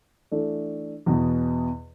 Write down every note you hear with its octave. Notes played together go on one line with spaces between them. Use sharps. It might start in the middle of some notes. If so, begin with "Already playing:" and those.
E3 A3 D4 A4
E2 B2 B3